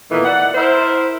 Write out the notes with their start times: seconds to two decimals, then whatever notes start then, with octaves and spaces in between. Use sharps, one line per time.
0.11 A#2 D#3 E3 A3 B3
0.25 D5 F#5
0.55 E4 A#4 C5